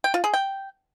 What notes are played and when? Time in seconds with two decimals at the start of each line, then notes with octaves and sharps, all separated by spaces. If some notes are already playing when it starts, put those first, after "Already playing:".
0.04 G5
0.14 F4
0.24 G#4
0.34 G5